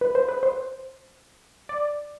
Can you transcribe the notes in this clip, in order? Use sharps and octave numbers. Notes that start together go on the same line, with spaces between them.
B4
C5
B4
C5
D5